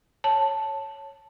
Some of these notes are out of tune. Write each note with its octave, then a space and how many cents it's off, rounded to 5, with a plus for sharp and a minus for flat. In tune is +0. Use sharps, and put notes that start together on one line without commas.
C#5 +0 A5 +0